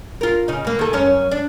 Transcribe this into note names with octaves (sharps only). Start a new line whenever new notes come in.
F4 A#4
C#3 D#4
B2 A#3
D#3 A4
F#2 C#4 C#5
D4